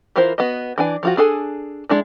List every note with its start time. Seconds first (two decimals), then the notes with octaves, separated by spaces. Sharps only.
0.16 E3 E4 F4 A#4 C5
0.38 B3 F#4 D#5
0.78 E3 D4 G#5
1.03 F3 F4 F#4
1.17 D4 G#4 A4 G#5
1.89 G#3 D4 E4